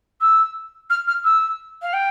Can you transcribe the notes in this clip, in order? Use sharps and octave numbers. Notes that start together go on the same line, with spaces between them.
E6
F6
F6
E6
F5
G5